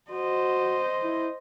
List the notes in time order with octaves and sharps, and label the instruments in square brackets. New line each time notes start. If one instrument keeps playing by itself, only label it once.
[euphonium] F#4 [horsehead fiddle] C5 D#5
[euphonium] E4